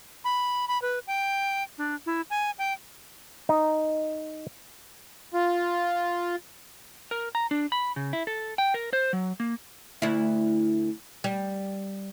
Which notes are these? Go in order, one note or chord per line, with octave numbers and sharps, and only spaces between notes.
B5
B5
B4
G5
D4
E4
G#5
G5
D#4
F4
A#4
A#5
D4
B5
C#3
E4
A4
G5
A#4
C5
F#3
A#3
D2 E4
G3